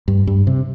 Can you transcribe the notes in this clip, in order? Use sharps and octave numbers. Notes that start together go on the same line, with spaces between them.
G2
G2
C3